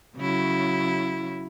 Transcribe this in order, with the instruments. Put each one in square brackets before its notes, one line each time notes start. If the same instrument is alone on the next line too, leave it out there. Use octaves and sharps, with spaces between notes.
[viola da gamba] C#3 F#3 E4